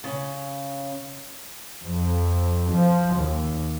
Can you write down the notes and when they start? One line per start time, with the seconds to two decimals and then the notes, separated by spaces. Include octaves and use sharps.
0.04 C#3
1.84 F2
2.73 F3
3.16 D#2